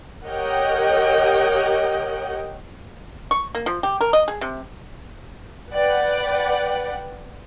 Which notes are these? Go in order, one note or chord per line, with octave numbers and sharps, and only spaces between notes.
G4 A#4 C#5 D#5 F#5 G5
C#6
A#3
F3
G4
A#4
D#5
G#4
C3
B4 D5 F#5 G5